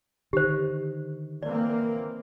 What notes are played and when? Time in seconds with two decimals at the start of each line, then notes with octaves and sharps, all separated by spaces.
0.33 D3 D#3 G4 C5
1.43 E3 A#3 C4 D5